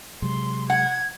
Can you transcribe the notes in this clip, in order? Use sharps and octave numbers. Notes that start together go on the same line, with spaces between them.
C3 F#3 G#3 C6
F#5 G#6